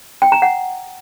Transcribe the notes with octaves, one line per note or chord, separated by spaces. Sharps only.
G5
A#5
F#5